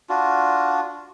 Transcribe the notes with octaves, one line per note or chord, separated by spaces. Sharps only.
D4 F4 F#4